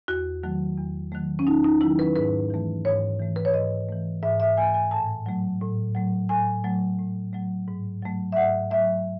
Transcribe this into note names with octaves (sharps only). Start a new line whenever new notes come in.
E2 F#4
D#3 F#3 A3
E2
D#3 F#3 A3
C#4
E2 D#4
D#4
D#3 F#3 A3 E4
B4
G#2 B4
E3 A3
G#2 C#5
E3 A3
B4
C#5
G#2 D#5
E3 A3
G#2 E5
E5
E3 A3 G#5
G#5
A2 A5
F#3 A3
A2
F#3 A3
A2 G#5
F#3 A3
A2
F#3 A3
G#2
F#3 A3
E5
G#2 F#5
F#3 A3 E5